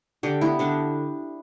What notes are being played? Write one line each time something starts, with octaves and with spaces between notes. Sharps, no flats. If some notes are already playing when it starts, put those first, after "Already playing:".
D3 G4
B3 E4
D3 D4